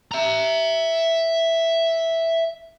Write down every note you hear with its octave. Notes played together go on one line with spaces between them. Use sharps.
E5 A#5